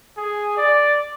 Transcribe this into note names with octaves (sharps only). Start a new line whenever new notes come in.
G#4
D5